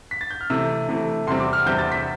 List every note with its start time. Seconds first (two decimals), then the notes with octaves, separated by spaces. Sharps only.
0.11 B6
0.21 A6
0.31 G6
0.41 F6
0.50 C3 E3 A3 E6
0.89 C3 E3 A3
1.27 E2 C3 G3 C4 C6
1.40 D6
1.53 F6
1.66 E2 C3 G3 C4 G6
1.79 A6
1.92 B6